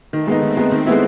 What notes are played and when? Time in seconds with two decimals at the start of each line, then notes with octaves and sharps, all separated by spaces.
0.13 D#3 A3
0.27 G#3 B3 D#4
0.42 D#3 C4
0.57 G#3 B3 D#4
0.72 D#3
0.86 G#3 B3 E4